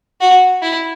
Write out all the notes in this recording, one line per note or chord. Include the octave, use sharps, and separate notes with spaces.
F#4
E4